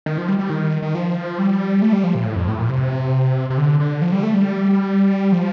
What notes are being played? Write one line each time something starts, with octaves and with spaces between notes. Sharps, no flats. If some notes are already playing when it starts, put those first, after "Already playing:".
D#3
F3
G3
G3
D#3
D#3
F3
G3
A3
G3
F3
A#2
A2
F2
A2
A#2
C3
C3
D3
D3
F3
G3
A3
G3
F3